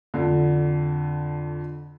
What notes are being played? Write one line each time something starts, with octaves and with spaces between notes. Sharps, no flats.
F2 D3